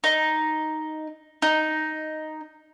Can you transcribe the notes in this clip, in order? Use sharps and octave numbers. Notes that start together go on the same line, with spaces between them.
D#4
D#4